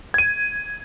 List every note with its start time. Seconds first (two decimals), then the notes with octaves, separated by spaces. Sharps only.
0.14 G#6 D#7